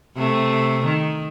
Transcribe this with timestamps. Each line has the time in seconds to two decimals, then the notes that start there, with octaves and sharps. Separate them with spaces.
0.17 C3 A3
0.85 D#3